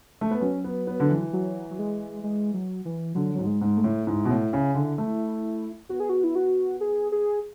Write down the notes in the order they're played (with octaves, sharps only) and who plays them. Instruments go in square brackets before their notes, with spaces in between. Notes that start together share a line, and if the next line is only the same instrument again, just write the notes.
[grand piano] A3
B3
[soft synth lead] F#3 [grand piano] C#4
[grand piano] B3
B3
D3
E3
[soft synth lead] F#3
F#3
G#3
G#3
F#3
E3
[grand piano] D3 [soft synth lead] F#3
[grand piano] G#2 [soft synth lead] F#3
[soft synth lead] G#3
[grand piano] G#2 [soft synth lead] G#3
[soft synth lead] A3
[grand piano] A2
[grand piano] G#2 [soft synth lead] E4
[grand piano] B2
A2
C#3
D3
A3
[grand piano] B3 [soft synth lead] F#4
[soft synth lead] G#4
F#4
E4
F#4
G#4
G#4